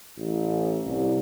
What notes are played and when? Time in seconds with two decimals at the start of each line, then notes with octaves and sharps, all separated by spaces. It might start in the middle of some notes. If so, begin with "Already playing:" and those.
0.17 A1
0.85 C2